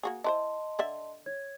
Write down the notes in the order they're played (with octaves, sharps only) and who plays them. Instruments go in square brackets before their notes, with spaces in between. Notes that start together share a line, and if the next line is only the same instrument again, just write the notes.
[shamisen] A#3 F#4 G#4
[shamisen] E4 B4 C5 [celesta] D#5 A5 C6
[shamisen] D3 D5 E5
[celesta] C#5 G#6